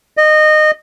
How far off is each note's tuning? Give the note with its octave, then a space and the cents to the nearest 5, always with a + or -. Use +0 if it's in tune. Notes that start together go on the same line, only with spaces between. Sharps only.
D#5 -20